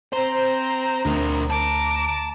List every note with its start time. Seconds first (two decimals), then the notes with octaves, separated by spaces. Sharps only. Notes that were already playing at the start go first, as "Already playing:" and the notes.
0.13 C4 C5 A#5
1.05 D2 D4 A#4
1.50 A5 A#5 D6